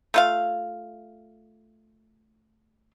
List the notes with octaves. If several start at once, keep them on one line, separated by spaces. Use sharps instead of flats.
A3 F4 F5